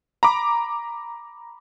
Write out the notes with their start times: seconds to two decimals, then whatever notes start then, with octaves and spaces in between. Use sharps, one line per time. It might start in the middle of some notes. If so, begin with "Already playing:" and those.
0.23 A#5 B5 D6